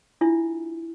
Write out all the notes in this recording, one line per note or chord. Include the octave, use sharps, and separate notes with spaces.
D4 E4 F4 E5